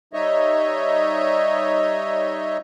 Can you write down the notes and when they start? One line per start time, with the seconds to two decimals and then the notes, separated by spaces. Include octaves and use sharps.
0.13 G3 D#4 C#5 D#5 E5